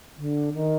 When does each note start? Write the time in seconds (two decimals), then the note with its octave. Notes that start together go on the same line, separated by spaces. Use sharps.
0.17 D3
0.54 D#3